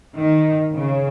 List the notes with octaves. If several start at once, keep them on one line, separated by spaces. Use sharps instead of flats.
D#3
C#3